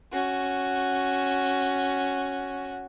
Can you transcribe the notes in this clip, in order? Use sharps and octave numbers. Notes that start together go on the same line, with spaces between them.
C#4 F#4